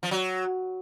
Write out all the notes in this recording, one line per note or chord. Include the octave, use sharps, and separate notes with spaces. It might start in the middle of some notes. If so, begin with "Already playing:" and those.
F3
F#3